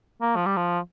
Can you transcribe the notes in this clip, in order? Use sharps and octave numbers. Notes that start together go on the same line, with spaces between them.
A#3
F3
G3
F3